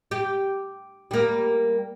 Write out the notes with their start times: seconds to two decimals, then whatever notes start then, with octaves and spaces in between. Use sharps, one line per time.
0.11 G4
1.11 G3 A#3